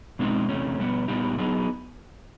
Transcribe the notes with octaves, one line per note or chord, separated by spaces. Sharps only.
B2 G#3 C4 D#4
E2 C3 E3 A3 C#4
B2 G3 B3
A#2 G3 B3 D#4 G4
F#3 B3 D#4 G#4